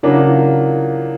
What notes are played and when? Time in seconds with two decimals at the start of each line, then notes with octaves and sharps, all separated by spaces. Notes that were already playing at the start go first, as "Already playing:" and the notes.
0.03 C#3 F#3 A#3 D4 E4
0.28 F4